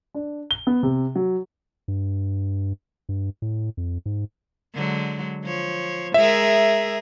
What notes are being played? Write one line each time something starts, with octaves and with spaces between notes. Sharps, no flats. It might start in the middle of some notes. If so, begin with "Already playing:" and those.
D4
G7
B3
C3
F#3
G2
G2
A2
F2
G#2
D3 F#3 G#3
F3 C#5
G#3 G#4 A#4 E5